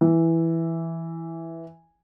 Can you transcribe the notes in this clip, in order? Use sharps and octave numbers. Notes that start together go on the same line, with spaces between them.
E3